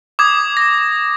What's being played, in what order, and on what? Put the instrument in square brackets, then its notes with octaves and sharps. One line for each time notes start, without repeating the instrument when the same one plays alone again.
[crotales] D6 D#6 G#6
A#6